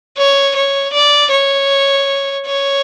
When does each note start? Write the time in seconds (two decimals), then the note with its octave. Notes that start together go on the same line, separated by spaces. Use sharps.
0.17 C#5
0.56 C#5
0.94 D5
1.31 C#5
2.46 C#5